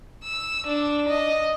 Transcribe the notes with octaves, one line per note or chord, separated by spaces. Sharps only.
E6
D4
D#5